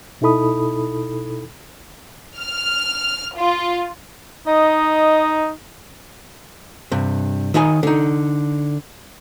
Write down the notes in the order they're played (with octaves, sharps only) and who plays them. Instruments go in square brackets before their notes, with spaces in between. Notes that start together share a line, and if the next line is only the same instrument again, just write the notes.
[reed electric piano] B2 D#4 E4 A4 B5 D#6
[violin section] F6
F4
[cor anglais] D#4 [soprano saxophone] D#5
[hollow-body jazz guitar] G2 C3
D#3 D#4 C#5 G#5
D3 D#4